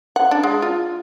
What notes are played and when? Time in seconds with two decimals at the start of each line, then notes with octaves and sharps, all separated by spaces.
0.16 F#5
0.31 D4
0.43 G#3
0.62 F4